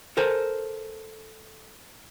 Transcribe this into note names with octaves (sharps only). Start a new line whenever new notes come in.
A4 A#4 C5 G#5